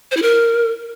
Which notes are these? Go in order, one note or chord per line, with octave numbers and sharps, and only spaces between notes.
C5
E4
A#4